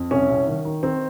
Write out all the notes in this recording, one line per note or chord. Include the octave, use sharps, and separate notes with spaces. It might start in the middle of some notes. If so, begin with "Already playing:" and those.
Already playing: F2
C2 C#4
C2
D#3
D#3
D#3 C4